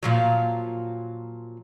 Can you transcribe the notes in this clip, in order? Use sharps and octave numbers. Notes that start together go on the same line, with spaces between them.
A#2 F3 F#3